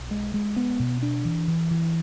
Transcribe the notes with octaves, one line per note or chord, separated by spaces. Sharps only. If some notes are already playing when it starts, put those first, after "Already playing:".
Already playing: B1
G#3
G#3
B3
B2
D4
E3
E3
E3